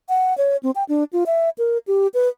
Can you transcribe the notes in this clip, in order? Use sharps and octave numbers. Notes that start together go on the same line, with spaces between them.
F#5
C#5
C4
G5
D4
F4
E5
A#4
G4
B4